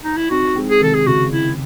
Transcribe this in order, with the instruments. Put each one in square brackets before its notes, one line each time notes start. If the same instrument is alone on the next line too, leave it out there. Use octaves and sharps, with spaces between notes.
[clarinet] D#4
E4
[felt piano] C4 D#4 [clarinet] F#4
[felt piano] G#3 C4
[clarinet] G#4
[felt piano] C3 D#3 [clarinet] A4
[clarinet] G#4
[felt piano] C#3 [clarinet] F#4
[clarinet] E4